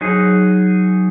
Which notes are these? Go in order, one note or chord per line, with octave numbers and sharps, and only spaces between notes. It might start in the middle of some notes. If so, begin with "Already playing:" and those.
F#3 D#4 G#4